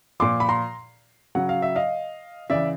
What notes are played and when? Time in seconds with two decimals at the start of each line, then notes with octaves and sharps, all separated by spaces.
0.20 A#2 F3 C6 D6
0.40 B5
0.49 A#5 C6
1.35 C#3 F#3 F#5
1.49 F5
1.62 E5
1.76 D#5 F5
2.50 C#3 E3 D5 E5